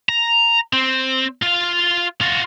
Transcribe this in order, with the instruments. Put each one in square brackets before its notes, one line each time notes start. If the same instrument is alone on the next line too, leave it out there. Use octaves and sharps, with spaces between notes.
[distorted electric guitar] A#5
C4
F4 F5
F4 F#4